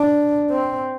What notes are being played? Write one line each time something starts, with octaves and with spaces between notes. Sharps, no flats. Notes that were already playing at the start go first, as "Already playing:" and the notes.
Already playing: D4
C4